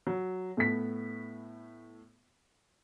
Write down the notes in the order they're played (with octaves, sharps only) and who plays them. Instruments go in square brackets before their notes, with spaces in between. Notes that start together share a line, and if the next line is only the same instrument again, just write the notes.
[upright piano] F#3
A2 A3 B3 B6